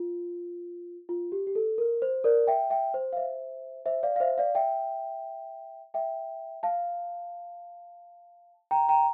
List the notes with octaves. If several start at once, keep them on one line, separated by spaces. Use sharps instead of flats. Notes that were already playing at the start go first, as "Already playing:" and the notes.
Already playing: F4
F4
G4
G4
A4
A#4
C5
A#4 D5
E5 G5
E5 G5
C5
F5
C5 E5
C5 E5
D5 F5
F5
C5 E5
D5 F5
E5 G5
E5 G5
F5 A5
G5 A#5
G5 A#5